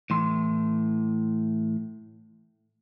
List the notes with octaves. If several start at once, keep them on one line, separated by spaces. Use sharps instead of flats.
A2 E3 C6